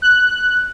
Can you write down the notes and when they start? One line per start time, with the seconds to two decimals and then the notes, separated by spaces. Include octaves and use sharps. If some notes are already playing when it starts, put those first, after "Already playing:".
0.02 F#6